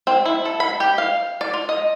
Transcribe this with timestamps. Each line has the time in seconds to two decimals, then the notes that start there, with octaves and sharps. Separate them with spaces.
0.07 C4
0.25 E4
0.45 A4
0.60 B5
0.80 G4
0.98 F5
1.41 D5
1.54 F4
1.69 D#5